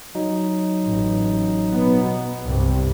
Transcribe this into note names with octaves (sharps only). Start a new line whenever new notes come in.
F#3 D#4
A1
B2 B3
C2 G2 C3